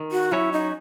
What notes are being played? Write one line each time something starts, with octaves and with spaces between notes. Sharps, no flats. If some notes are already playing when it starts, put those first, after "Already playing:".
Already playing: D#3
F#4
F#3 C#4 E4 F#4 C#5
D#4